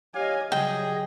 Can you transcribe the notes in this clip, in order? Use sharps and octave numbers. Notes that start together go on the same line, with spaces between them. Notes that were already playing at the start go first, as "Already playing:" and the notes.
G4 C#5 D#5 F5 G#5
C#3 F#3 G3 G#4 D#5 G5